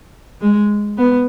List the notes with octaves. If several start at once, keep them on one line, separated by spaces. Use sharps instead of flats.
G#3
B3